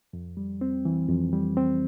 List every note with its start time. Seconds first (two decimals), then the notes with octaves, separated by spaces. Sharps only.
0.13 F2
0.37 G3
0.61 C4
0.85 E3
1.09 F2
1.33 G3
1.57 C4